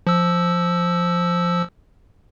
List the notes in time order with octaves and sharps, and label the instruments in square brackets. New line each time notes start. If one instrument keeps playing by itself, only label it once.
[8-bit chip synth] F3 E6